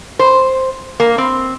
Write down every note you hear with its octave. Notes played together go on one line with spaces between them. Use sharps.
C5
A#3
C4